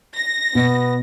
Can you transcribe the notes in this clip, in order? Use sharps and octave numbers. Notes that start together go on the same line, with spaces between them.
A#6
B2 B3